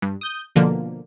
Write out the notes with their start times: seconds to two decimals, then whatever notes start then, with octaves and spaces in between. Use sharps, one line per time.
0.02 G2
0.21 D#6 G6
0.56 B2 D3 F3 A#3